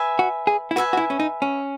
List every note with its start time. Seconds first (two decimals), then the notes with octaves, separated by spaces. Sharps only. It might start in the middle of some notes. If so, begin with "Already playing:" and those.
Already playing: B4 E5 G#5
0.19 F#4
0.47 G#4
0.71 E4
0.76 F#4 B4 E5 G#5
0.93 F#4
0.97 E4
1.10 C#4
1.20 D#4
1.42 C#4